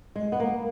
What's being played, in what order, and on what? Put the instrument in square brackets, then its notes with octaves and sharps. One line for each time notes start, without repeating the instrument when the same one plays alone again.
[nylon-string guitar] G#3
B3
A#3